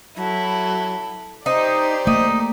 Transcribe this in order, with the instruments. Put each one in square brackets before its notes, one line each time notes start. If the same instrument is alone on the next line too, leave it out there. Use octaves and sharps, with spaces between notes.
[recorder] F#3 [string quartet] E4 A4
[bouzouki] D#4 [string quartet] G4 D5 [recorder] C5
[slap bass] A3 A#3 [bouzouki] D#4